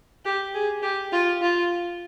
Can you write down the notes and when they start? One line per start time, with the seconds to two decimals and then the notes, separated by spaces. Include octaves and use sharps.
0.25 G4
0.54 G#4
0.82 G4
1.12 F4
1.41 F4